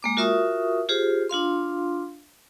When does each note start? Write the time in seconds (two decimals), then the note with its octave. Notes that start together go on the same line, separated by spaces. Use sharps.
0.03 G#3 A#3 D6
0.17 F4 F#4 A#4 E5 C#6 D#6
0.89 F4 G4 G#4 C5
1.29 D4 F4 F5 C6